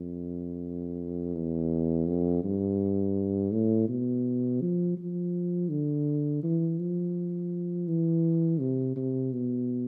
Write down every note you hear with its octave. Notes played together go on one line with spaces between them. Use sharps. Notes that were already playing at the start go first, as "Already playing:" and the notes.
Already playing: F2
E2
F2
G2
A2
B2
F3
F3
D3
E3
F3
E3
C3
C3
B2